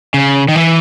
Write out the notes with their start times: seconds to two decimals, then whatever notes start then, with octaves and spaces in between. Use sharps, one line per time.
0.14 C#3
0.48 D#3
0.56 E3